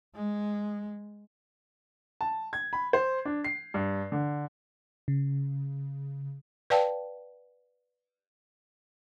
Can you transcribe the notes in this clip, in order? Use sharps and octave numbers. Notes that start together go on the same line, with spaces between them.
G#3
A5
G#6
B5
C5
D4
C7
G2
D3
C#3
B4 D5 F5 G5 A5